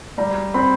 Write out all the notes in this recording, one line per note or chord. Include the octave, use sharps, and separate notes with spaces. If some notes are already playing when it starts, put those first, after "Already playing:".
G3 A#5
C4 B5